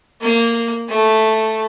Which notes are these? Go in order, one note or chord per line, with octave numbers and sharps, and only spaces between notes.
A#3
A3